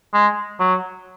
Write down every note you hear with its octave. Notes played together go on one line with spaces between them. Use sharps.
G#3
F#3